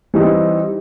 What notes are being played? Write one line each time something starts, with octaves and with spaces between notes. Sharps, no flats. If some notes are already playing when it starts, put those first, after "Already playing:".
E3 G3 C4 D#4